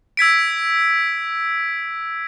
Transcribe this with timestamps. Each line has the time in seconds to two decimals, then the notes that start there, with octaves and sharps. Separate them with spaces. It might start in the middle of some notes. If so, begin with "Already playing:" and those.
0.17 E6 G#6 B6 D7